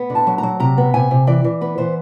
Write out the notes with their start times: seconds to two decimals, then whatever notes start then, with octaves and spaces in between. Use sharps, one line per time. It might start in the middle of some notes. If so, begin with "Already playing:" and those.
Already playing: B3
0.10 D3
0.15 A5
0.27 F#3
0.38 A#5
0.43 F#3
0.60 C3 A#5
0.77 B3
0.94 C3 G#5
1.11 C3
1.27 E3 D5
1.44 E3
1.61 B3 B4
1.78 E3 C5